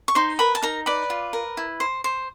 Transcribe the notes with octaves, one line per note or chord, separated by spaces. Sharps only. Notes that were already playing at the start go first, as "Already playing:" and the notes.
C#6
D#4 C5 C6
A#4 B4 B5
A5
D#4 A#4 A#5
B4 D5 B5
F4
A#4
E4
C5
C5